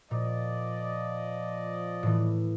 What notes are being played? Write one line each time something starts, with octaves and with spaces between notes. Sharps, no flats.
A#2 F3 D5 D#5
A2 E3